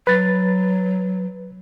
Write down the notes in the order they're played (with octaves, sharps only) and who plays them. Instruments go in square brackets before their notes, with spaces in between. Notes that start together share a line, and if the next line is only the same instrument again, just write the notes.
[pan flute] F#3 [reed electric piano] B4 A6